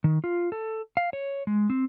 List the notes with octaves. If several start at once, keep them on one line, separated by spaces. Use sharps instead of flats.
D#3
F4
A4
F5
C#5
G#3
C4